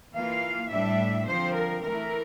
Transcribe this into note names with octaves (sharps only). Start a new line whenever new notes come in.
E3 A#3 F4 F5
A2 G3 D4 E5
D3 F3 C4 C5
A#4
E3 A3 E4 A#4